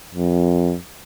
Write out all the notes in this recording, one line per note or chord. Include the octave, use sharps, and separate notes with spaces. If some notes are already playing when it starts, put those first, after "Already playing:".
F2